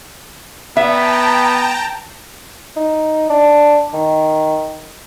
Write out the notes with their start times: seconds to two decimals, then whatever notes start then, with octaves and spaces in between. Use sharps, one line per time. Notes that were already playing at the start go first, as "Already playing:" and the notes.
0.77 B3 E5 G5 A5 A#5
2.76 D#4
3.30 D4
3.93 D#3